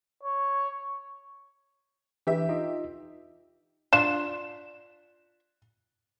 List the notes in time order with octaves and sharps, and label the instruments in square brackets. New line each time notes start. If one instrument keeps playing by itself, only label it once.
[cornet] C#5
[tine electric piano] E3 D4 B4 [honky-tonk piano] G4 E5
[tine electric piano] D#4 F4 D#5
[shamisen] D4 F4 [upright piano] E7